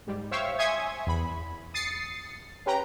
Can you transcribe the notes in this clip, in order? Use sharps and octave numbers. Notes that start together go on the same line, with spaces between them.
G#2 G3
C5 C#5 E5 F5 G5 C#6
E5 G#5 C6 C#6 D#6 G#6
E2 B5
D#6 A6 C7 C#7
C#4 G4 B4 G5 A#5